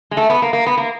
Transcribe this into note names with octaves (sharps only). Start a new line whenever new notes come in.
G#3
A3
B3
A#3
A#3
B3
A#3